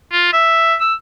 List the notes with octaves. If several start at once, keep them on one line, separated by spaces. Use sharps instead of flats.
F4
E5
E6